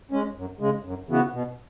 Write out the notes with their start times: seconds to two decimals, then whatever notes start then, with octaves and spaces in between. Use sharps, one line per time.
0.11 G#3 C#4
0.36 F#2
0.60 C#3 G#3
0.84 F#2
1.09 C#3 E3 B3 F#4
1.33 B2